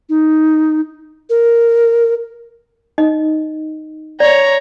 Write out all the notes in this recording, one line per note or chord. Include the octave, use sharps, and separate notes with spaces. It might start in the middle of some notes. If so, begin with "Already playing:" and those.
D#4
A#4
D#4 D#5
C#5 D5 A#5